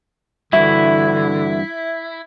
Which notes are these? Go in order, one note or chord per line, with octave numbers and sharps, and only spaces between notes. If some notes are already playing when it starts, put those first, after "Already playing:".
G2 D3 E3 E4 F#4 E5